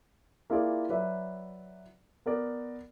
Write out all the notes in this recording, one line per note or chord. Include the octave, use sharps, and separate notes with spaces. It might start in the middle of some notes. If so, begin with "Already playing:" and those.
A#3 E4 F4 G#4 D5
F#3 B4 D5 E5
B3 A#4 D5